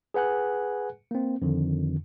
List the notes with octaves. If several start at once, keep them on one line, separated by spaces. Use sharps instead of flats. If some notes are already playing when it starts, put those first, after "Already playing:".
G#4 B4 F#5 G#5 F#6
A#3 C4
F2 D3 D#3